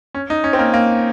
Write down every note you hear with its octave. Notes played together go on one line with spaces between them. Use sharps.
C#4
D#4
C#4
C4
A#3
A#3